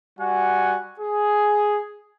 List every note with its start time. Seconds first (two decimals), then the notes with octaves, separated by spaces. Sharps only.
0.19 G3 F#4 F#5 G#5
1.00 G#4